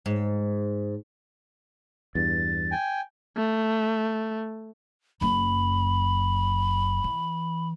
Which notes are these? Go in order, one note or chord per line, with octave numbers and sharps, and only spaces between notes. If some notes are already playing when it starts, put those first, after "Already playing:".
G#2
E2 G2 A6
G5 G#5
A3
F#1 F#2 B5
E3